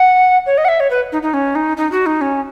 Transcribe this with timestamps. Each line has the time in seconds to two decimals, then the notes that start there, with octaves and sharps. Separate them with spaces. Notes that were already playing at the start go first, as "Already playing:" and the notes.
Already playing: F#5
0.46 C#5
0.58 D#5
0.65 F#5
0.68 E5
0.80 C#5
0.91 B4
1.12 D#4
1.23 D#4
1.34 C#4
1.55 D#4
1.77 D#4
1.92 F#4
2.06 D#4
2.21 C#4